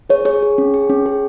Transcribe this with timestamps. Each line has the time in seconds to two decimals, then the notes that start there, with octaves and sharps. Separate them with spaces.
0.10 G#4 C#5
0.25 G#4 C#5
0.42 G#4
0.58 C#4
0.74 G#4
0.90 C#4
1.06 G#4